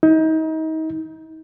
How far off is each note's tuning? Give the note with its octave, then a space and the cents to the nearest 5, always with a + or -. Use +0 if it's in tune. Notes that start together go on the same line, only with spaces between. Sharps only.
D#4 +30